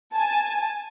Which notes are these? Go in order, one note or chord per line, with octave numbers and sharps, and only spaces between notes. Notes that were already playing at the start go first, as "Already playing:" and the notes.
G#5 A5